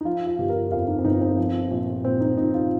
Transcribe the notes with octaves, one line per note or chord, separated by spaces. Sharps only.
D#4
F3 F4
F4
G1 G4
A#4
F2 F5
D#4
C4
G1 D#4
C4
F3
A#1
A#2 C4
D#4
A#1 D#4
F4